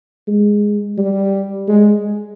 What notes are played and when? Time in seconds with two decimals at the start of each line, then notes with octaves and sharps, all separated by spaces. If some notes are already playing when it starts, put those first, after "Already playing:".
0.28 G#3
0.98 G3
1.68 G#3